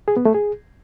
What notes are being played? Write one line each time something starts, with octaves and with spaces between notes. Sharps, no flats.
G#4
B3
A3
G#4